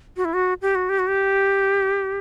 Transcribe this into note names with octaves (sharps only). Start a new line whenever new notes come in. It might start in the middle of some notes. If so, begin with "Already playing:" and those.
F#4
E4
F#4
G4
F#4
G4
F#4
G4